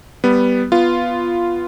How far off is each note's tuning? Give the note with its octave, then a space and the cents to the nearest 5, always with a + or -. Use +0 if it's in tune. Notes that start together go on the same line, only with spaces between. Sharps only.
G3 +0 B3 +0
B3 +0 F4 -5